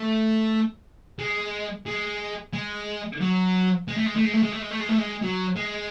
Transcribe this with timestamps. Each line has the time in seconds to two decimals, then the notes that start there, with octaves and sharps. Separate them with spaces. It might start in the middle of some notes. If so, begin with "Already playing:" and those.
Already playing: A3
1.19 G#3
1.86 G#3
2.53 G#3
3.21 F#3
3.88 G#3
3.97 A3
4.06 G#3
4.16 A3
4.25 G#3
4.34 A3
4.43 G#3
4.52 A3
4.62 G#3
4.71 A3
4.80 G#3
4.89 A3
4.98 G#3
5.22 F#3
5.56 G#3